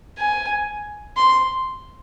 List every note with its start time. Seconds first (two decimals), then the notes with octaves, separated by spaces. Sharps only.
0.18 G#5
1.17 C6